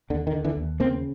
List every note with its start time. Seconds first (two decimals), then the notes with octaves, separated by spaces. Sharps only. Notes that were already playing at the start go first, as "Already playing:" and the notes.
0.10 D#2 D3
0.27 D#3
0.33 D3
0.44 D3 E3
0.57 D#2
0.80 C#3 A#3 C4